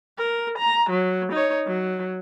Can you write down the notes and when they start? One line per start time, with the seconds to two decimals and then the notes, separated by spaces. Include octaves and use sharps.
0.18 A#4
0.58 A#5
0.90 F#3
1.32 D#4 C#5
1.67 F#3